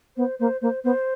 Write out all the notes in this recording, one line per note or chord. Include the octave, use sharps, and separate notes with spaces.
B3 C5
A#3 C5
A#3 C5
B3 C5